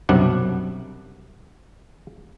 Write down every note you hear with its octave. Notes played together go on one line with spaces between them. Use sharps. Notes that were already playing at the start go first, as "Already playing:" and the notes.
B1 F#2 C3 G3 D4 F#5